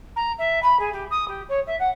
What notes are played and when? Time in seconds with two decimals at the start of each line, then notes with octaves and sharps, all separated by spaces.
0.16 A#5
0.38 E5
0.62 B5
0.79 G#4
0.93 G4
1.11 D#6
1.28 G4
1.49 C#5
1.67 E5
1.79 F#5